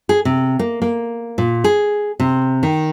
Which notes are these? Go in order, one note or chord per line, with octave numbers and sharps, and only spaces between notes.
G#4
C3
A#3
A#3
A#2
G#4
C3
D#3